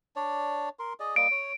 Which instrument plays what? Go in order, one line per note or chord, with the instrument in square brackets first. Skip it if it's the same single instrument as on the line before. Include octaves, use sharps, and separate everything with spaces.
[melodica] D4 C#5 D5
A#4 C6
G#4 D5 D#5
[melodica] G3 A#3 D#5 [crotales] D7
[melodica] C#5